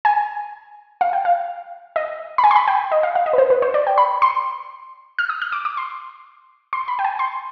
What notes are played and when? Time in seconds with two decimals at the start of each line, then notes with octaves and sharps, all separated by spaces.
0.05 G#5
1.01 F5
1.13 G5
1.25 F5
1.96 D#5
2.38 B5
2.44 G#5
2.51 C6
2.56 B5
2.68 G5
2.92 D#5
3.03 F5
3.15 F5
3.26 D#5
3.33 B4
3.38 C5
3.50 B4
3.62 C5
3.74 D5
3.87 G5
3.98 B5
4.22 C6
5.19 F6
5.29 D#6
5.42 F6
5.52 D6
5.65 D6
5.77 C6
6.73 C6
6.88 B5
6.99 G5
7.05 G#5
7.19 C6